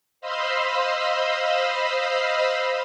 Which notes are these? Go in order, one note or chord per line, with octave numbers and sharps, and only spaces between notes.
C5 D#5 F5 B5 C6 E6